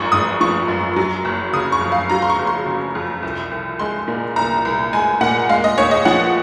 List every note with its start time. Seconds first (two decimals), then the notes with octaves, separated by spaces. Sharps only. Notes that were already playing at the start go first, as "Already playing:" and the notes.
Already playing: G#1 F#2 F3 C#6
0.12 G#1 D#6
0.41 F3 C#6
0.68 F#2
0.96 F#3
1.25 F#1
1.53 C#3 D#6
1.72 C#6
1.81 F2
1.92 F5
2.09 F#3 A#5
2.22 C6
2.30 C#6
2.39 F#1
2.47 C6
2.66 C#3
2.95 F2
3.23 C2
3.51 C2
3.79 G#3 C6
4.08 A#2
4.36 C2 A#5
4.65 C2
4.93 G#3 G#5
5.21 A#2 F#5
5.49 G#3 F5
5.64 D#5
5.78 D#2 C#5
5.91 D#5
6.05 F3 F#5